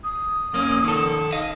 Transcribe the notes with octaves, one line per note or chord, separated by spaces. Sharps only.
D#6
F2 A#3 C#4
D#3 A4
D#5 F5